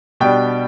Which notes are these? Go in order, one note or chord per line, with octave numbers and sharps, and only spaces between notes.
B2 G3 D4 G5